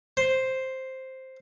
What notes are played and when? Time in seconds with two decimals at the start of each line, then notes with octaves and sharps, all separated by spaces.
0.17 C5